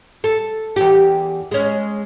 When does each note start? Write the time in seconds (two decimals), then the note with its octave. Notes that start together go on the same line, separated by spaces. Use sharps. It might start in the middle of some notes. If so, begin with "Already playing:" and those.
0.24 A4
0.76 E2 G4
1.51 G#3 C#4